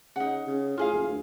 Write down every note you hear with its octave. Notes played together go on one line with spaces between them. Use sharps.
C#3 D#4 F#5
C#3
A2 F4 G#4 F5
F#1
D2